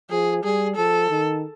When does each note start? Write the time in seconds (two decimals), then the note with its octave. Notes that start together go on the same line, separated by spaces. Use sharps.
0.10 F3 G#4
0.44 G3 G#4
0.76 F3 A4
1.10 D#3